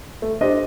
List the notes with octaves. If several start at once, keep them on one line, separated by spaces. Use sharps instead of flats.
A3
D4 G4 C5 D#5